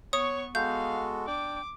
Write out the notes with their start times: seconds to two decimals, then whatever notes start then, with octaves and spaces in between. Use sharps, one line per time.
0.13 B3 C#5 C#6 D#6
0.55 G#3 B3 F#4 A4 F5 G6
1.27 D4 G5 D6